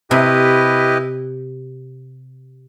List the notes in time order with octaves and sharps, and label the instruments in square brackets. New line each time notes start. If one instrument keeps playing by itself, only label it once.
[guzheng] C3 [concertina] E4 G4 B4 D#5